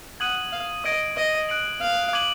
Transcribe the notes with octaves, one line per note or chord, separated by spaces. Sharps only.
F#5 D#6 G#6 D#7 F#7
F5
D#5 D#6 G#6 D7
D#5
F#6 D7 F#7
F5
D6 G#6 D#7 F#7